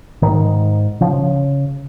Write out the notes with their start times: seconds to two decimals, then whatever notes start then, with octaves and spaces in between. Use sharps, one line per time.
0.22 G#2 D#3
1.01 C#3 F3